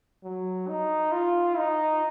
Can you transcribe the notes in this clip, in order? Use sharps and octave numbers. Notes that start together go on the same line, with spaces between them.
F#3
D#4
F4
D#4